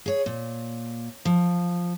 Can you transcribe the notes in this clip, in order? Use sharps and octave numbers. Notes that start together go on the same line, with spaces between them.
G#4 C#5
A#2
F3